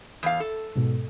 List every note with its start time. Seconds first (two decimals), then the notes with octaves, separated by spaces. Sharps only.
0.23 E2 F5
0.40 A4
0.75 G#2 B2